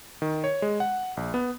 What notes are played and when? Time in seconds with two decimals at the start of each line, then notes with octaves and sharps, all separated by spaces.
0.22 D#3
0.44 C#5
0.62 G#3
0.80 F#5
1.17 A#1
1.34 B3